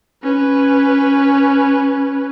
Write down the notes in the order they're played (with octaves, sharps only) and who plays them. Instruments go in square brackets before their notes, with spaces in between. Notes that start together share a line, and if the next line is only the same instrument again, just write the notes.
[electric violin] C#4 B4